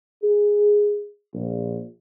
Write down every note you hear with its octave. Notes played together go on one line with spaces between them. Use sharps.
G#4
A#1